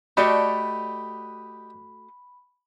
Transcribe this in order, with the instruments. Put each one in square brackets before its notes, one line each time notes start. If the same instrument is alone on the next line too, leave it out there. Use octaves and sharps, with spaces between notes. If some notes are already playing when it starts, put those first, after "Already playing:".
[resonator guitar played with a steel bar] A3 F#4 D5 [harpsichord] G4 D#5 [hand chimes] B5